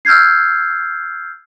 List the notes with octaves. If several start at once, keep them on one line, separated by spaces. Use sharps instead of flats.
E6 F6 G6 G#6 C7